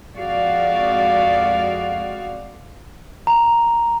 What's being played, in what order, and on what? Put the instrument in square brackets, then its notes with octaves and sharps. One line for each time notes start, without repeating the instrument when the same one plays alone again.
[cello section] F2 G#3 F#4 G#4 D5 F5
[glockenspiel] A#5